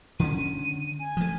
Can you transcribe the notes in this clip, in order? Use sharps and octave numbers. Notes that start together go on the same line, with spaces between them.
D3 C#4 D#7
G#5
F3 A3